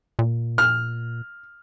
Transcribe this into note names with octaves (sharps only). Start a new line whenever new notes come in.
A#2
F6